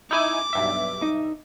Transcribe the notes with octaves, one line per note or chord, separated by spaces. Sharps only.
D#4 E4 G#5 D6
B1 G2 E5
D#4